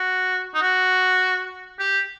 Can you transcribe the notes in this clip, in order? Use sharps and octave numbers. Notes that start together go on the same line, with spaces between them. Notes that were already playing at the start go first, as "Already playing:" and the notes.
Already playing: F#4
D#4
F#4
G4